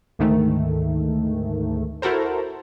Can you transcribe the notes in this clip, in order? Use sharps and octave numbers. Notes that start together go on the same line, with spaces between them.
D2 G#2 D#3 A3
E4 F#4 A4 A#4 C5